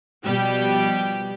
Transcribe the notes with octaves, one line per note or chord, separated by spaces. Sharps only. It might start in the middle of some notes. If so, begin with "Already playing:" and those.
B2 F3 G3 G4